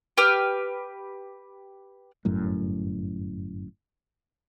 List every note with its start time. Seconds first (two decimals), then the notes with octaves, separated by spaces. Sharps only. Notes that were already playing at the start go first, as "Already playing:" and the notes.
0.17 G4 B4 F6
2.25 G1 F#2 A2